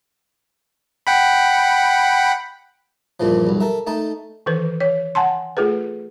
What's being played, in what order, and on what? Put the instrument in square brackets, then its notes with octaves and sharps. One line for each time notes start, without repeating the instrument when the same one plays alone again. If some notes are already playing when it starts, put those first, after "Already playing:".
[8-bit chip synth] F#5 G5 B5
[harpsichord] E2 G2 A#2 E3 F3
B1 G2
A4 A#4 E5
A3 D#4 A5
[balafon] D#3 E3 A4 B4
C#5
F#5 G#5 A5 C6
A3 F4 G#4 A4 B4